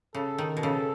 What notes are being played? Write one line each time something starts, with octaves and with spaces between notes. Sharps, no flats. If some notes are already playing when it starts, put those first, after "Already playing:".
C#3 A4
D#3
B2
C#3 A4